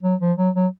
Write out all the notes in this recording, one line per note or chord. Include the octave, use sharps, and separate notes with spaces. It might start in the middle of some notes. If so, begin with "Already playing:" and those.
F#3
F3
F#3
F#3